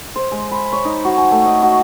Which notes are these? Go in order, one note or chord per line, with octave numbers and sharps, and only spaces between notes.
C5
G#3
B5
C#5
D#4
F#4
G#5
A3
D#5
F#4